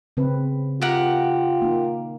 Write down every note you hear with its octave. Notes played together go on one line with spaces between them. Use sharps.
C#3 C4 B4
F4 G4 A#4 F#5
A#3 D#4